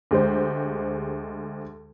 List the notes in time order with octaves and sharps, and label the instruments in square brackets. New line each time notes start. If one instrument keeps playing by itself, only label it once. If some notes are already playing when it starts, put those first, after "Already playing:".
[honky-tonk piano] D2 G#3 G4 C5